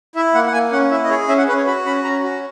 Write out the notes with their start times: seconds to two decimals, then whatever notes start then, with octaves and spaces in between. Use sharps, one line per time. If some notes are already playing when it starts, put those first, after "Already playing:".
0.15 E4 E5
0.34 A#3 F#5
0.47 F#5
0.53 A#3 G#5
0.72 C#4 F#5
0.91 E4 E5
1.04 D#5
1.09 G#4 C#5
1.29 C#4 E5
1.38 F#5
1.48 C#4 B4
1.57 C#5
1.67 F#4 B5
1.85 C#4 B5
2.04 C#4 A#5
2.23 F#4